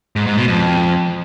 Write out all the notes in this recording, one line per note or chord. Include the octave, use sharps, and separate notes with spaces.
G#2
G#2
B2
F2